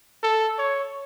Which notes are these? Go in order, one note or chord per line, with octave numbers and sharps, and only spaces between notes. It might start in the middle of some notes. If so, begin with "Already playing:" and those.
A4
C#5